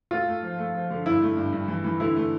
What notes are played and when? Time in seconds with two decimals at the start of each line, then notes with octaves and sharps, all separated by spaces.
0.11 A3 F4
0.28 A3
0.42 F3
0.59 A3
0.75 F3
0.90 D3
1.06 G2 E4
1.22 A3
1.37 G2
1.53 G2
1.68 E3
1.84 E3
2.00 D3 E4
2.16 A3